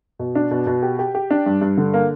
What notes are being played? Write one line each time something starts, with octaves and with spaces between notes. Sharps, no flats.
B2
D4
B2
B2
G4
G4
G4
D4
G2
G2
D3
A#3